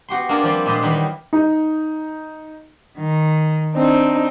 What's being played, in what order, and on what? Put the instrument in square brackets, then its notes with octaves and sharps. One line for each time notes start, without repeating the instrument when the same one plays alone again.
[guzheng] B3 F#4 G4 C6
A#3 D4 F4 G#4 A#4
F3 G3 C4
A#2 G#3 G4 B4 D#5 C6
D#3 E3 F#3 G3 D#4
[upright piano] D#4
[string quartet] D#3
C4 D4 D#4